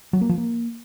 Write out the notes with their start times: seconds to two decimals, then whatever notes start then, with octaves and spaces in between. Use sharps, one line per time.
0.13 F#3
0.21 A#3
0.29 F3
0.37 A#3